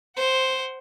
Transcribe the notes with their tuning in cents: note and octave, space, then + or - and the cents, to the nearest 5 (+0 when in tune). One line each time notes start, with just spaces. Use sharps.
C5 +0 F#5 +30